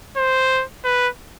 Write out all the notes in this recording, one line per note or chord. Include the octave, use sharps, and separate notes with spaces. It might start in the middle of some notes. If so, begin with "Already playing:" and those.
C5
B4